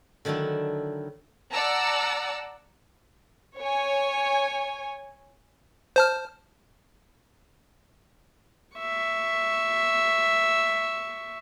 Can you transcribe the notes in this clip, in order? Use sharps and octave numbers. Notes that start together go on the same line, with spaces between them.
D3 D#3 F#3 A3 E4
D5 F#5 A5 A#5 E6
C#5 G#5
C5 A5 F6
E5 C#6